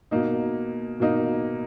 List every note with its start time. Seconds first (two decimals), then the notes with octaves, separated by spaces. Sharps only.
0.11 B2 A#3 D#4
1.00 B2 A#3 D#4